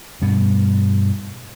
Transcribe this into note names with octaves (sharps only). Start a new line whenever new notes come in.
G2 B2